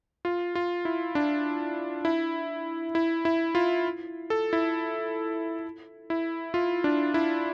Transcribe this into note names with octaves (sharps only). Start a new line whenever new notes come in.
F4
F4
E4
D4
E4
E4
E4
F4
A4
E4
E4
F4
D4
E4